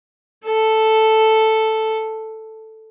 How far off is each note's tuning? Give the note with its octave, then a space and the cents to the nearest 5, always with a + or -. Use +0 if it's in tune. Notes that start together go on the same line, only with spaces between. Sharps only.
A4 +0